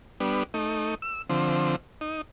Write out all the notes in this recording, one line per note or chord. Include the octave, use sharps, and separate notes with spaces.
G3 B3 D4
A3 D#4
E6
D3 F3 C4
D#4